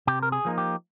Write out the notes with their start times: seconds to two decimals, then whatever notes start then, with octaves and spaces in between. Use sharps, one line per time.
0.07 C3 G4
0.23 A#4
0.32 G#4
0.45 F3 A#3 D#4
0.58 G4